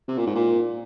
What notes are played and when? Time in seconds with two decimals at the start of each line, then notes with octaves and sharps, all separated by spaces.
0.08 C3
0.18 A#2
0.27 G#2
0.35 A#2